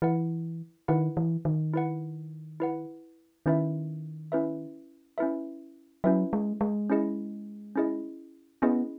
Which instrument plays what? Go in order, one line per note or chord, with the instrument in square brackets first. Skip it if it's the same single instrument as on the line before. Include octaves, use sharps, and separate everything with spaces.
[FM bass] E3 [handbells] E4 B4 F#5
[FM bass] D#3 [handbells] E4 B4 F#5
[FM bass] E3
D#3
[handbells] E4 B4 F#5
E4 B4 F#5
[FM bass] D#3 [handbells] C#4 E4 B4 E5
[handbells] C#4 E4 B4 E5
C#4 E4 B4 E5
[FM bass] F#3 [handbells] C#4 E4 B4 E5
[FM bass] G#3
G#3
[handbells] C#4 E4 G#4 D#5
C#4 E4 G#4 D#5
[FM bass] B3 [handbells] C#4 E4 G#4 D#5